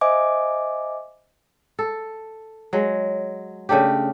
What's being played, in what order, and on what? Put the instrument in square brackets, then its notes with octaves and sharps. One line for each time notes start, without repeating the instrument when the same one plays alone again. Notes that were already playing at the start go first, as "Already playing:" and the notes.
[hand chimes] C5 D#5 E5 G#5 D6
[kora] A4
F#3 G#3
C#3 A3 D4 G4